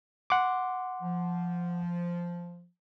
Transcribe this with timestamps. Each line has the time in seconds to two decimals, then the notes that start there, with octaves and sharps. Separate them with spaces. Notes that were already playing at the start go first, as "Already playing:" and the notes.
0.30 F#5 C6 D6
1.02 F3